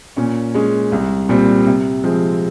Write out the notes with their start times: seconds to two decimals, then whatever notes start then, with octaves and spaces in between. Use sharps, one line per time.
0.17 A#2 C#4
0.54 G#3 C#4
0.92 C2
1.29 A#2 G3 C4
1.67 C3
2.04 F3 G#3 C4